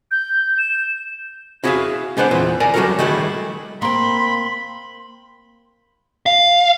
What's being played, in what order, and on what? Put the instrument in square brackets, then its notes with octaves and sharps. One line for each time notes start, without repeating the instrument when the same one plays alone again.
[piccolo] G6
E7
[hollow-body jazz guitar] E4 F#4 G#4 D5 E5 F5
G#3 B3 D4 C5 F#5
E2 A#2 C4 B4
A#4 D5 G#5 A#5
F#3 G3 D4 F#4 A4 A#4
D#3 G3 A3 E4 F#4 G#4
[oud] A#3 C4 [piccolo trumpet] B5 [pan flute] C6
[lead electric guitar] F5